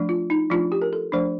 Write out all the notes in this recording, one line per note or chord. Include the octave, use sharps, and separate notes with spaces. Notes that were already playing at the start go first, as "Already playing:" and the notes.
Already playing: F3 A3 D4
F4
D#4
F3 A3 D4 F4
G4
A#4
A4
F3 A3 D4 C5